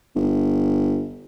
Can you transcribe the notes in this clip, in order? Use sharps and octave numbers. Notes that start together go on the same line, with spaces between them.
G1